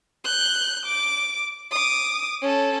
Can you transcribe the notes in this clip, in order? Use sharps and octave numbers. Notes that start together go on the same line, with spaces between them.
F#6 G6
D6
D6 D#6
C#4 A4